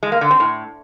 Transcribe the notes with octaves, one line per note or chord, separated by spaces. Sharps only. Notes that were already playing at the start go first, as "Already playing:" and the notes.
G#3
A#3
D3
C4
A2